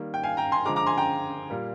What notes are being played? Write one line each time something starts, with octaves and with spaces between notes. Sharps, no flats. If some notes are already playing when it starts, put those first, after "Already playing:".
Already playing: D#3 G3 A#3
G5
F5 G#5
G5 A#5
G#5 C6
D3 F3 G#3 A#5 D6
A#5 D6
G#5 C6
G5 A#5
A#2 G3 A#3